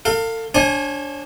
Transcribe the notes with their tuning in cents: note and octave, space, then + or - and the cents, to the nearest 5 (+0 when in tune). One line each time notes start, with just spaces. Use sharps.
A4 +40 F5 +10
D4 -20 C#5 -40 G#5 +0